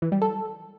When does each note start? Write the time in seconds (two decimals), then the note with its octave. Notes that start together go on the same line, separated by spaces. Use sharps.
0.02 E3
0.12 G3
0.22 A4